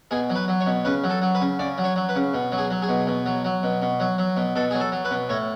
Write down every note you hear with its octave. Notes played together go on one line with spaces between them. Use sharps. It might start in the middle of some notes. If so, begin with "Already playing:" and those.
B2 G#4
F#3
B4
F#3
C#5
B2
C#3 B4
F#3
A4
F#3
B4
C#3
C#3 D5
F#3
C#5
F#3
B4
C#3
B2
F#3
G#4
F#3
G#4
B2
B2
F#3
F#3
B2
B2
F#3
F#3
B2
B2 A4
F#3 G#4
A4
F#3
B4
B2
A2 C#5